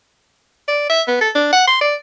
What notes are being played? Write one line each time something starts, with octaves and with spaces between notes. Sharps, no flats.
D5
E5
B3
A4
D4
F#5
C6
D5